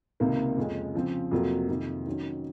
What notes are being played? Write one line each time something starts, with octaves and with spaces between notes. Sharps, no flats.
C#2 C3 D#3 A#3
F2 C#3 G#3 C#4
C#3 F3 C4
F2 C3 F#3 A#3
F2 C3 D#3
D#3 F#3 C#4